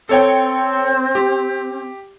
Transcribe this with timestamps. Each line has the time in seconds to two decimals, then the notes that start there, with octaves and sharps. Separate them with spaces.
0.09 C4 A4 C#5 G5
1.15 G4